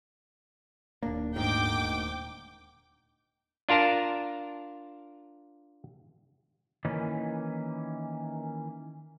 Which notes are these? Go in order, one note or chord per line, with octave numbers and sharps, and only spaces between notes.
D#1 A#3 D4
D2 G#2 D#3 G5 D6
D4 F4 A#4 A5 A#5
D#3 E3 A#3 C#4 B4